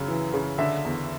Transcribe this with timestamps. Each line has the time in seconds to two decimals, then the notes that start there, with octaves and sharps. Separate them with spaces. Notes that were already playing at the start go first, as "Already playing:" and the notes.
Already playing: F#2 C#3
0.08 E3
0.34 C#3
0.58 D3 E5
0.85 E2